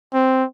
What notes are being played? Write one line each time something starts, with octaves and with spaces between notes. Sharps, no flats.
C4